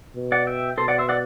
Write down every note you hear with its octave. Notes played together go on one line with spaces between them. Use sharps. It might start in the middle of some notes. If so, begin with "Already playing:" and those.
B2
D5 F#5
E5 G5
B2 A4 C5
D5 F#5
C5 E5
D5 F#5